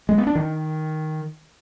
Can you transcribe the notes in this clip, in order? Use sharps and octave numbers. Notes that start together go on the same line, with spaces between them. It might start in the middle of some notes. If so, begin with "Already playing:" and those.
G#3
B3
D4
D#3